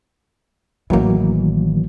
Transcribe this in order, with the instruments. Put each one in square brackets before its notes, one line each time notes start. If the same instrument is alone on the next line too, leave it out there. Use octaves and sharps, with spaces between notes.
[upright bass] A1 D#3 [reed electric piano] E3 F#3 A#3